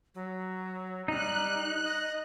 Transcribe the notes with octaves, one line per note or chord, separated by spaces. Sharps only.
F#3
G3 D#4 F#6
D#5